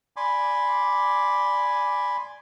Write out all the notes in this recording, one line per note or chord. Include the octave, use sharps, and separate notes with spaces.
D5 G#5 B5 C6 D6